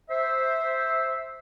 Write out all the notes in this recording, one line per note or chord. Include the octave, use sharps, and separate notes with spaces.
C5 E5